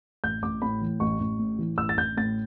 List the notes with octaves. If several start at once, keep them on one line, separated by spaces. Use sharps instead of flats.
A1 G6
A1 D6
A2 B5
E3
A1 C#6
A1
A2
E3
A1 E6
A6
A1 G6
A2 A6